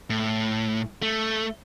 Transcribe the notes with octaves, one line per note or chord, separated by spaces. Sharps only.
A2
A3